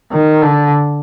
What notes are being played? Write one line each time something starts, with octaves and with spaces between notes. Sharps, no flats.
D#3
D3